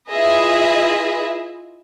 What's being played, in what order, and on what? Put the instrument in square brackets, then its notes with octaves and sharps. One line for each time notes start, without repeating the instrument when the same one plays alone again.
[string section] E4 F4 G#4 B4 D#5 E5